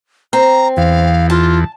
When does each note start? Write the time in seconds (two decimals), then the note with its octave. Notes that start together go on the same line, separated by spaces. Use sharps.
0.33 C4 A#5
0.77 E2 F5
1.30 F4 A5